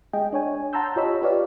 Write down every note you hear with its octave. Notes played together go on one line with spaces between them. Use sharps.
G#3 G#4 D#5 G5
D4 C#5 G#5
F#5 A5 A#5 C6 E6 G6
F4 G4 C#5 D#5 B5 E6
F4 G4 B4 C#5 D5 F5